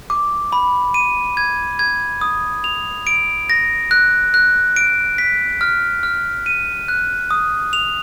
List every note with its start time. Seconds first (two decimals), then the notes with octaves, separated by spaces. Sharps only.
0.10 D6
0.52 B5
0.94 D#7
1.37 G#6
1.79 G#6
2.21 D#6
2.64 F7
3.07 D7
3.50 A#6
3.91 F#6
4.34 F#6
4.76 D7
5.18 B6
5.61 F6
6.03 F6
6.46 D#7
6.88 F#6
7.31 D#6
7.73 F7